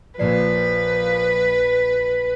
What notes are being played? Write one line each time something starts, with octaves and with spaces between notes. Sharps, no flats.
A#1 A#2 F3 A#3 B4 D5 C7